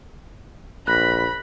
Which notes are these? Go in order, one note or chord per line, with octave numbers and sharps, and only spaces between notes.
A#1 B5 F#6 A#6